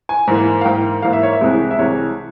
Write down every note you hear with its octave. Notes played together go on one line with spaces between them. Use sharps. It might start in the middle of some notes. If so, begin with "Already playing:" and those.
G#5
G#2 E3 A#3
F5
G#2 E3 A#3 G5
G#2 E3 A#3 F5
E5
C#5
E5
C2 C3 E3 G#3
E5
C2 C3 E3 G#3 C#5